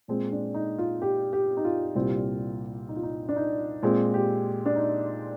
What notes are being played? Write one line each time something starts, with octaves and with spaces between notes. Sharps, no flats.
A#2 G#3 C4
D4
D#4
F4
G4
G4
D#4
F4
C2 A#2 G3 C4
D#4
F4
D#4
D4
D#4
A#2 G#3 C4
G4
D4
D#4